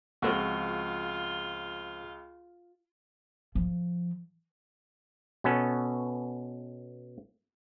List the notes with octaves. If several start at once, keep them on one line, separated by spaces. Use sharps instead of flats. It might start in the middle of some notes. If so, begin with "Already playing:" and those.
C#2 F3 A#3 C4 F4 F#4 A4 C5
F3
B2 B3 C#4 A4